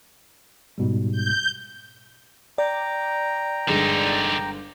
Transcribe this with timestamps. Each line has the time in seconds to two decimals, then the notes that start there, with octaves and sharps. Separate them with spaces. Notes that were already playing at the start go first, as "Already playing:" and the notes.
0.78 G#2 B2 G3
1.12 G6
2.58 D5 G5 A#5
3.68 G1 D3 G#3 D#4 F7